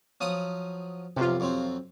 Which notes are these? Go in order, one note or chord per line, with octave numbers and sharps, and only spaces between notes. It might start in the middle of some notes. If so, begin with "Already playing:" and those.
F3 F#3 D#6
B1 F2 C3 F4
F2 F#3 C4